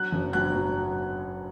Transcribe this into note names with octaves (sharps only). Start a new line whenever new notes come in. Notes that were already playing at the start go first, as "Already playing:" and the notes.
Already playing: F#3 F#6
F#1
F#3 F#6
F#3